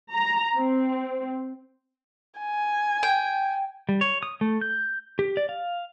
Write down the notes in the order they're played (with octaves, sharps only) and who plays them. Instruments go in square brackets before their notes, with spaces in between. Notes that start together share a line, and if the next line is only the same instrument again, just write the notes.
[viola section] A#5
C4
[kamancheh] G#5
[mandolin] G5
[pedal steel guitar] G3
C#5
D#6
A3
G6
G4
D5
F5